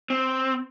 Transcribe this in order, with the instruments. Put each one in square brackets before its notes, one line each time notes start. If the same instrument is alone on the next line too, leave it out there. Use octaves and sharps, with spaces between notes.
[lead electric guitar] C4